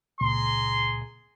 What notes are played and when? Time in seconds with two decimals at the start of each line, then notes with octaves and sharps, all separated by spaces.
0.21 C#2 A#2 G#4 A#5 C6